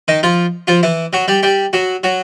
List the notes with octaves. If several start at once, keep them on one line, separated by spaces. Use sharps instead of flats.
D#3 D#4
F3 F4
F3 F4
E3 E4
F#3 F#4
G3 G4
G3 G4
F#3 F#4
F#3 F#4